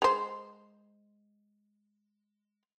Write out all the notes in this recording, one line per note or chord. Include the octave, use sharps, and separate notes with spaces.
G#3 C5